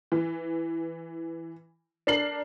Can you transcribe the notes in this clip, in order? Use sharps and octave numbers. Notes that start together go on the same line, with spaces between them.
E3
D4 A#4 C7 F#7